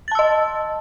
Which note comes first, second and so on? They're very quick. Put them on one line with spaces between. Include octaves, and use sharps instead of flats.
A6 A5 E6 D#5